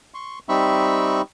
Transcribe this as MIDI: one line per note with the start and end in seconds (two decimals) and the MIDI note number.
0.14 0.39 84
0.14 0.39 85
0.49 1.22 55
0.49 1.22 60
0.49 1.22 63
0.49 1.22 76
0.49 1.22 83
0.49 1.22 85